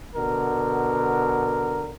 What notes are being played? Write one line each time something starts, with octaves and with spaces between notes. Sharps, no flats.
B2 D3 A#4